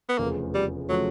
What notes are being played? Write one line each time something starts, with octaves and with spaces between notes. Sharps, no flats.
B3
F1 E2 C#3 F3 A3 A#3
G3
C#3 F3 F#3 A3